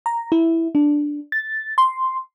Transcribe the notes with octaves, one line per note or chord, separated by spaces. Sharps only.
A#5
E4
D4
A6
C6